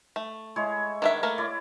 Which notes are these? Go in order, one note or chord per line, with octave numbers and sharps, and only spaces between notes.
A3
G#3 E4 C#5
D#3 D4 E5 F#5
A3 A#3 A#4
E4 C#5 D5